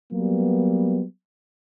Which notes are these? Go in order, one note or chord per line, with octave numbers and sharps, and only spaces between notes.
F#3 G3 A#3 B3